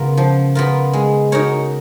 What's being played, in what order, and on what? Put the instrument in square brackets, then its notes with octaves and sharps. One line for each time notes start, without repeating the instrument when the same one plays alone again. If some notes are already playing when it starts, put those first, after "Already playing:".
Already playing: [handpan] C#3 [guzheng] B3 F4 A#4
[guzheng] F3
B3 F4 A#4
G#3
D#4 F#4 A#4 C#5